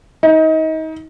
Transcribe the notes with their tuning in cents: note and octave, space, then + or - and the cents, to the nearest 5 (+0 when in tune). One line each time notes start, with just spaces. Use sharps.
D#4 +30